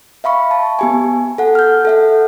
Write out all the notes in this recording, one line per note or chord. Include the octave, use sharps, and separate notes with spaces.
E5 F5 B5 C#6
A5
B3 G4 G#5
A4 F#5
F6 G6
A4 E5 F#5